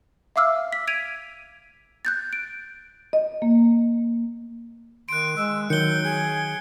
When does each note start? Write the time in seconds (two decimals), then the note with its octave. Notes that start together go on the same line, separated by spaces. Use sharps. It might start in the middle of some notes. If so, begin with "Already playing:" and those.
0.36 E5 F5 D6 E6 F6
0.73 B6
0.87 G#6 D7 D#7 F7
2.05 F#6 G6 A6
2.33 D7
3.13 D#5
3.42 A#3
5.09 D#3 C6 F#6 D7
5.36 G#3 E6
5.70 D#3 F#3 G6 C#7 G7
6.04 G#4